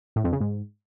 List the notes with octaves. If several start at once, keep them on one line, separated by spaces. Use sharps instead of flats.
A2
F2
C#3
G#2